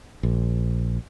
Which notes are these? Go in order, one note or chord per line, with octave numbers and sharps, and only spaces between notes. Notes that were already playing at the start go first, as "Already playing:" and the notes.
A#1